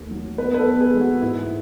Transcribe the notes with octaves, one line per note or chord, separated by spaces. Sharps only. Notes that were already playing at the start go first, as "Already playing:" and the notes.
Already playing: D#2 A3
F#3
B3 B4
B4
A4
E2
G#4
G#3
F#4
G#2 E4